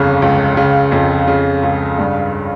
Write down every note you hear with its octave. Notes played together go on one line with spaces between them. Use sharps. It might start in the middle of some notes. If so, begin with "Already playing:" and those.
Already playing: G1 F2 C#3
C#2
C#3
F2
C#3
C#2
G2